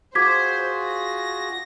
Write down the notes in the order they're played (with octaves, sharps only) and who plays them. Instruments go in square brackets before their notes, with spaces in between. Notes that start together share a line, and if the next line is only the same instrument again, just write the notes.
[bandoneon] F4 F#4 G#4 [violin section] C5 [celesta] D6 G#6 B6
[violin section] A#6